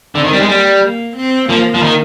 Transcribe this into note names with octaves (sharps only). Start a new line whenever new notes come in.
D3 C4
D#3
G3
G#3
G3 A#3
A#3
C4
F3 A#3
F3
D#3